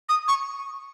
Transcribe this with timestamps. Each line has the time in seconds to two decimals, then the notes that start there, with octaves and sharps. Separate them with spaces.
0.09 D#6
0.28 C#6